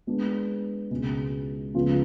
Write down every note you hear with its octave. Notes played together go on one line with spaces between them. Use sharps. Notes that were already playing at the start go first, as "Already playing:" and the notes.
G#3 B3 D4
C#2 B2 G#3
C#2 C#3 F3 B3 F4